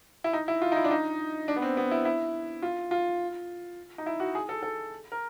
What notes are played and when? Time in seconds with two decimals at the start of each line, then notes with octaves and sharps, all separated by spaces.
0.24 E4
0.33 D#4
0.48 E4
0.62 F4
0.72 D#4
0.76 E4
0.84 D4
0.91 D#4
1.48 D4
1.56 B3
1.62 C4
1.77 B3
1.91 E4
2.05 E4
2.62 F4
2.91 F4
3.98 D#4
4.06 E4
4.20 F#4
4.35 G#4
4.49 A4
4.63 A4
5.12 A#4